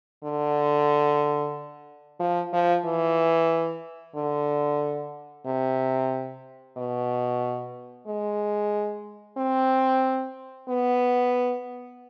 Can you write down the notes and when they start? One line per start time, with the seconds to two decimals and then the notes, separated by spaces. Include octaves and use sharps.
0.24 D3
2.19 F3
2.53 F3
2.85 E3
4.16 D3
5.46 C3
6.77 B2
8.07 G#3
9.37 C4
10.69 B3